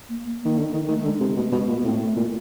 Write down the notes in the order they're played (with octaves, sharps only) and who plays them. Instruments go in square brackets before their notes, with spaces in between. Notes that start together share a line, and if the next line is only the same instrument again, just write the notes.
[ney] A#3
A#3
[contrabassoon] D#3 [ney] A#3
[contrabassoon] D3
D#3
[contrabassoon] D#3 [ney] A3
[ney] A3
[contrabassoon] D3 [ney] G#3
[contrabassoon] C3 [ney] G#3
[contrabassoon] B2 [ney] A3
[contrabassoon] B2 [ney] G#3
[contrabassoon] A#2
[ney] B3
[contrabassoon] A2 [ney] C4
[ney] A3
[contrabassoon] A#2